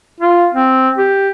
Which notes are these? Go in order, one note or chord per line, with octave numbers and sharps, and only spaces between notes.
F4
C4
G4